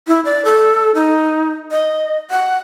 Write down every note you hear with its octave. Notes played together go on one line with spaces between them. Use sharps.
E4
D5
A4
D#4
D#5
F#5